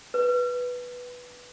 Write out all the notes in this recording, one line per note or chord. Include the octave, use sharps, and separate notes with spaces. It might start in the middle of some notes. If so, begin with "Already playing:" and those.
B4